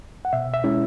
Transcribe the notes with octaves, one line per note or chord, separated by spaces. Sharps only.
F#5
B2 E5
E5
G#3 C#4 E4